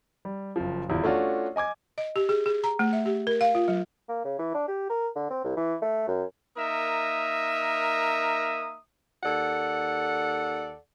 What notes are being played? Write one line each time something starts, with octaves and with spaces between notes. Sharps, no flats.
G3
F#1 F3
D#1 E2 E4 F4
A3 C#4 D4 F4 F#4
D#5 G#5 D6 G#6
D#5
G4
G#4
G#4
A#5
A3
E5
G4
A#4
F5
F4
F#3
A#3
C#3
E3
D4
G4
A#4
D3
C4
C2
E3
A3
F#2
A#3 D#4 A#4 E5 A#5 D#6
D#2 A4 D5 F#5